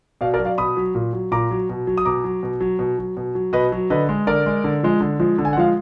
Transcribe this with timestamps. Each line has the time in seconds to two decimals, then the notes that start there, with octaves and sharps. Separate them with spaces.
0.21 B2 D5 F5
0.34 A#4 D5
0.39 F#3
0.45 D5 F5
0.58 B2 B5 D#6
0.77 F#3
0.95 A#2
1.13 F#3
1.32 A#2 A#5 D6
1.51 F#3
1.69 B2
1.87 F#3
1.97 D#6
2.05 B2 A#5 D6
2.24 F#3
2.43 B2
2.60 F#3
2.79 B2
2.98 F#3
3.17 B2
3.35 F#3
3.53 B2 B4 D#5
3.72 F#3
3.90 D3 B4 D#5
4.09 G#3
4.27 D3 A#4 D5
4.46 G#3
4.64 D3
4.83 F3 G#3
5.00 D3
5.19 F3 G#3
5.38 D3
5.45 G#5
5.53 F#5
5.57 F3 G#3 F5